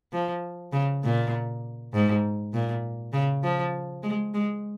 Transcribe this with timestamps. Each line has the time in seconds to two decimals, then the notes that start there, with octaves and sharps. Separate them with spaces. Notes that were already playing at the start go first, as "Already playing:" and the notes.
0.13 F3
0.73 C#3
1.04 A#2
1.94 G#2
2.53 A#2
3.13 C#3
3.43 F3
4.03 G#3
4.34 G#3